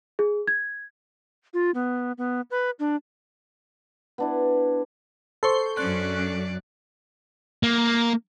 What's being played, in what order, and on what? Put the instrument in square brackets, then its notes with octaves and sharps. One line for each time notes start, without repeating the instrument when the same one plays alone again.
[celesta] G#4
G#6
[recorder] F4
B3
B3
B4
D4
[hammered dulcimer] B3 D4 E4
[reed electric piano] A4 C#6 [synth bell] C5 C6
[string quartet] F#2 D5 [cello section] F#3 C#4 D4 [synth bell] F#6
[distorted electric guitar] A#3